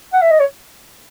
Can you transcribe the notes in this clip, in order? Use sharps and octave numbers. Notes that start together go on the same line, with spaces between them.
F#5
E5
D#5
C#5